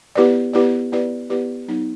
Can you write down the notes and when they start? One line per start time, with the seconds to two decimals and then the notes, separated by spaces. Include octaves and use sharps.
0.15 B3 E4 G4 B4 D5
0.53 B3 E4 G4 B4 D5
0.92 B3 E4 G4 B4 D5
1.30 B3 E4 G4 B4 D5
1.68 F#3 B3 D#4